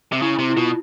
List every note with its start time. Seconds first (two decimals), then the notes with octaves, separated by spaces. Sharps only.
0.12 C3
0.22 C#3 E4
0.39 C3
0.50 E4
0.56 B2 F4